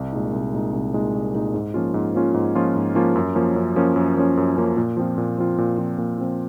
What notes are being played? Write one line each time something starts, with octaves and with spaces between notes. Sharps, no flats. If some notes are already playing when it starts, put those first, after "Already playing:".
Already playing: C2
A#2 G#3 D#4
C2
A#2 G#3 D#4
C2
A#2 G#3 D#4
C2
A#2 G#3 D#4
G#2
F3 A#3 C#4 F4
G#2
F3 A#3 C#4 F4
G#2
F3 A#3 C#4 F4
G#2
F3 A#3 C#4 F4
F#2
F3 A#3 C#4
F#2
F3 A#3 C#4
F#2
F3 A#3 C#4
F#2
F3 A#3 C#4
A#2
F3 C4 F4
A#2
F3 C4 F4
A#2
F3 C4 F4
A#2
F3 C4 F4